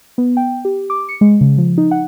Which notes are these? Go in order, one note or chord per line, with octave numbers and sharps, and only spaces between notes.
B3
G5
G4
D6
C#7
G#3
C#3
F3
D#4
F#5